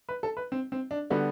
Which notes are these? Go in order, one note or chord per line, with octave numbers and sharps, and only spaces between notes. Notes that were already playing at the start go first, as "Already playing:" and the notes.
B4
A4
B4
C4
C4
D4
D3 G3 B3 F#4